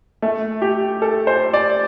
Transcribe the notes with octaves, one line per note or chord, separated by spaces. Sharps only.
A3
G4
A4
C5
D5